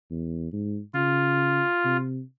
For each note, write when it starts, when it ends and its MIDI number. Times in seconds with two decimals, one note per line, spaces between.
0.11 0.48 40
0.53 0.80 44
0.94 1.63 49
0.94 1.97 65
1.85 2.21 48